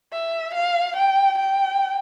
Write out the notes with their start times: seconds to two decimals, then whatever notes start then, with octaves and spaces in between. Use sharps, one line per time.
0.13 E5
0.55 F5
0.97 G5
1.39 G5